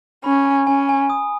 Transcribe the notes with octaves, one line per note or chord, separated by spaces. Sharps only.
C#4 B5
G#5
C#4 G#5
G#5
D#6